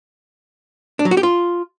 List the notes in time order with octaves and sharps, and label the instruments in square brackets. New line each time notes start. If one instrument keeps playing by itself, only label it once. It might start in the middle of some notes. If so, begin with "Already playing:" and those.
[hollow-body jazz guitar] D4
F#3
F#4
G4
F4